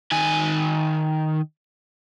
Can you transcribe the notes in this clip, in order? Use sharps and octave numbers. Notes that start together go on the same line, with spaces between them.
D#3 G#5